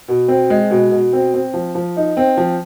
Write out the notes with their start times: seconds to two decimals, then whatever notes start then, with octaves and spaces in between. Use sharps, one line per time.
0.08 B2
0.28 C4
0.50 G#3
0.70 B2
0.91 B2
1.13 C4
1.34 C4
1.54 F3
1.75 F3
1.97 D#4
2.17 C4
2.37 F3